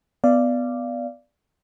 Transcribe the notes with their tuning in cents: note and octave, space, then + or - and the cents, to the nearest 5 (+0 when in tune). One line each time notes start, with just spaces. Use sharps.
B3 +15 D5 +0 F5 -25